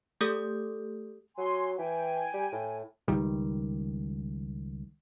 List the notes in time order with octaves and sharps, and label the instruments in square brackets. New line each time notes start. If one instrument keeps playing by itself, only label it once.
[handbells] A3 G4 A4 D#6 G6
[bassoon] F#3 [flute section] G#5 C6
[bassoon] E3 [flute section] G5 G#5
[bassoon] G3
A2
[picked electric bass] C#2 D#3 G3